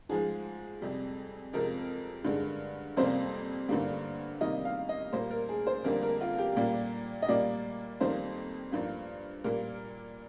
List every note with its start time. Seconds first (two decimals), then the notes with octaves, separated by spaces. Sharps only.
0.09 G#2 F3 G#3 G#4
0.81 F2 C3 G3
1.53 F2 C3 F3 G#3 A#4
2.25 G2 D3 G#3
2.97 F2 C3 G3 A#3 C5
3.69 G2 D3 G3 A#3
4.41 C3 D#3 G3 A#3 D#5
4.65 F5
4.89 D#5
5.13 A#2 G3 A#3 C5
5.31 A#4
5.49 G#4
5.67 C5
5.84 F2 D3 G3 A#3 A#4
6.03 A#4
6.21 F4
6.38 G4
6.56 A#2 G3 A#3
7.22 D#5
7.29 A#2 G3 A#3 D5
8.00 F2 D#3 G3 A#3 C5
8.72 G2 F3 A#3
9.44 A#2 G3 A#3 A#4